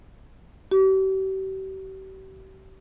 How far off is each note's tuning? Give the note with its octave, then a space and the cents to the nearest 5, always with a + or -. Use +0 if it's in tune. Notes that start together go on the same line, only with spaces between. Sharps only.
G4 -40